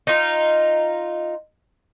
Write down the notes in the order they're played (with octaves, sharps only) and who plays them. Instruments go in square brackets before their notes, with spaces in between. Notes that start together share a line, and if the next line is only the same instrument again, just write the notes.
[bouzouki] D#4 F4